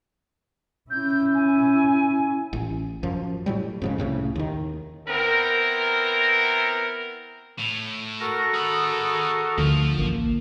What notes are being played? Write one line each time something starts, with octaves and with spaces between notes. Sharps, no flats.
C#4 E4 G6
G#5
A1
F#2 F3
A2 F#3 G3
F2 G#2 C#3
C2 A2 C#3
D#2 D#3
B3 C4 E4 A#4
A2
F#4 A4 A#4 A#6
G#4 B5 D#6
D2 D3 F3
A1 A#3